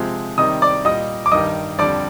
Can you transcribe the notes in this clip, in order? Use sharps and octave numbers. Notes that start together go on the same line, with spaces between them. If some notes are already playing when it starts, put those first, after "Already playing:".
Already playing: C3 F3 G#3
C3 D#3 G3 D#5 D#6
D5 D6
A#2 G3 D#5 D#6
D6
G2 D#3 G3 D#5 D#6
F2 D3 G3 D5 D6